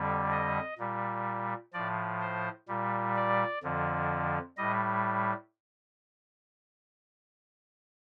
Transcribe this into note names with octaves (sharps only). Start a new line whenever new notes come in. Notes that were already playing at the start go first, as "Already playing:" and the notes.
Already playing: F2 D3 G3
D#5
A#2 G3
A2 F3 D5
C5
A#2 G3
D5
F2 D3 F3
A2 G3 D#5